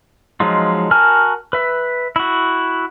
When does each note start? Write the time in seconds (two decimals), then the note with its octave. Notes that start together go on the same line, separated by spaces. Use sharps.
0.40 F3 F#3 G#3 D#4 F4
0.91 F#4 A#4 G#5 A5 F6
1.53 B4 E5
2.16 E4 F#4